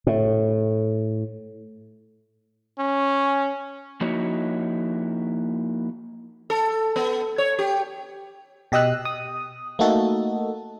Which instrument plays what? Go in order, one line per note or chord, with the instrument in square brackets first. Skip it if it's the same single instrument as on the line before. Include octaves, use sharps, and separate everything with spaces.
[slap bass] A2
[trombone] C#4
[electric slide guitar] F3 A#3 D#4 E4 F#4 C#5
[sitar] A4
B3
C#5
G4
[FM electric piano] B2 G4 D#5 D#6 E6 F#6
D#6
A3 A#3 D#4 F#4 A4